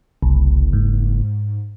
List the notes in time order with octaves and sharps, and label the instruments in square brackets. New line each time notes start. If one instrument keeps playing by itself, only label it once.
[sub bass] F#1 [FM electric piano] C2
[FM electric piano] G#2